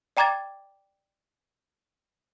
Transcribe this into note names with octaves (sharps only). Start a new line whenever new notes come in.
D5 G5 A#5 D6 G#6 A6